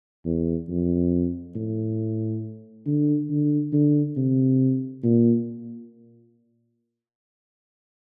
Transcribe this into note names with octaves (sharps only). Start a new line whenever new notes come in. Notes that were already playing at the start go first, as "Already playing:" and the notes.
E2
F2
A2
D3
D3
D3
C3
A#2